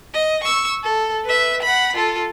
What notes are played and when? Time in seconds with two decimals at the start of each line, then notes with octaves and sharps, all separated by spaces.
0.14 D#5
0.44 C#6 E6
0.83 A4
1.25 B4 E5
1.63 F#5 B5
1.96 F4 A4